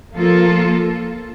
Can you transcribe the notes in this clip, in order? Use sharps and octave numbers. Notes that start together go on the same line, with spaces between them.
F3 A#3 F4 A4